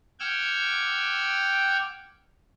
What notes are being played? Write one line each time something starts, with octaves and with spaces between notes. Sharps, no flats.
F#5 G5 D6 E6 F6 G#6